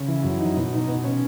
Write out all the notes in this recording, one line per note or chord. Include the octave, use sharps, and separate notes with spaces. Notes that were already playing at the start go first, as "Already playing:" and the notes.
Already playing: C#3
E3
F#2
D#4
B2
D#4
B2
C#4